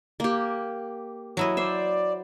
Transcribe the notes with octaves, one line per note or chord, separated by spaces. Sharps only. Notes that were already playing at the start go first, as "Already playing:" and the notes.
A#3 G4
F#3 E4 D#5
C5 D5 E5